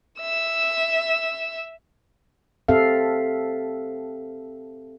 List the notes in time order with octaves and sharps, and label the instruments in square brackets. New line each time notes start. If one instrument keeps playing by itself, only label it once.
[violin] E5 E6
[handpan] C4 G4 A4 E5 F5